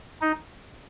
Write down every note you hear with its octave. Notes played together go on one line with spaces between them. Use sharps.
D#4